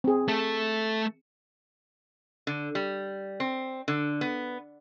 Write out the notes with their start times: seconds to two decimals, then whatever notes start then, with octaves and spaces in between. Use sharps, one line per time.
0.04 C4 G#4
0.28 A3 A4
2.47 D3
2.75 G3
3.40 C4
3.88 D3
4.21 B3